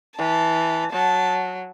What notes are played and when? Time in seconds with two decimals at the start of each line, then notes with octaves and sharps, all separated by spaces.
0.18 E3 A5
0.92 F#3 A5